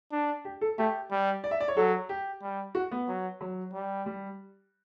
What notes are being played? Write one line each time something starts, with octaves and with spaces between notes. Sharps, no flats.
D4
G4
A4
A3 G4
G3
D5
E5
D5
C#5
F#3 A4
G4
G3
F#4
B3
F#3
F#3
G3
G3